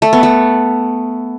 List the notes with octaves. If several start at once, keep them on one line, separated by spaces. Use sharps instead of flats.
A3
B3
A3